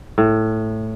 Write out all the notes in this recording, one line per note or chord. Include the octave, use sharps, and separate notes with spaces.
A2